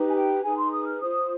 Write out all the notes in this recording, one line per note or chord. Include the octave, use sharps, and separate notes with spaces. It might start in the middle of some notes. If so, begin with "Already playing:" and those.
Already playing: D#4 G4 B4
G#5
G5
D#4 G#4 B4 G#5
C6
D#6
F6
F4 C5 D#6